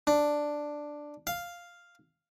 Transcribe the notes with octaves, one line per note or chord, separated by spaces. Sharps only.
D4
F5